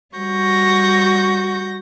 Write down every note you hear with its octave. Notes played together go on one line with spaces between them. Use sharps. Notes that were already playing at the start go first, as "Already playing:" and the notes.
G3 F#4 C#6 G6 A#6